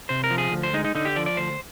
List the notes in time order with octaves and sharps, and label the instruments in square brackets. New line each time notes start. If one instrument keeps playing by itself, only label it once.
[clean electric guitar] C3 C5
A#4
F3
G#4
D2
C5
G#3 D#4
D#4
D3 D#4
G4
F3 D5
D5
D2 C5